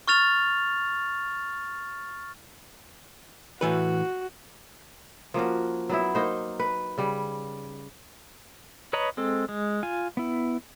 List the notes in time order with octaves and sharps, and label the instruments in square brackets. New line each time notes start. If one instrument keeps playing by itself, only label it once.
[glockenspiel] C#6 F6 A6 F7
[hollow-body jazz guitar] A2 E3 B4 [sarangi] F#4
[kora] F3 A#3 C#4 F#4
F#3 B3 E4
A#3 D#4 C5
B4
C#3 G3
[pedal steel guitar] B4 C#5 D#5 A#5 B5
G#3 C4 A4
G#3
F4 G#5
B3 E4